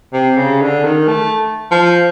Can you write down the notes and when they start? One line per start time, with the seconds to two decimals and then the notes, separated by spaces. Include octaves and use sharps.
0.14 C3
0.38 C#3
0.62 D3
0.84 D#3
1.08 A3
1.72 F3